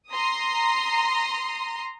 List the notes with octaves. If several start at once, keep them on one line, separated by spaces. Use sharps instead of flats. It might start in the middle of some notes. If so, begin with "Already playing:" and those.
A#5 C6 D#6